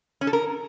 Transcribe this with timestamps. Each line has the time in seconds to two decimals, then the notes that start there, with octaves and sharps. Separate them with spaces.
0.21 C#4
0.27 A4
0.33 A#4